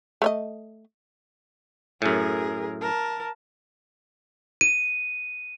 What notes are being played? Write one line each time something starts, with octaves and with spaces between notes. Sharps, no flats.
A3 C#5 D#5
F#2 A2 G#4 A#4
A#4 A5
D#7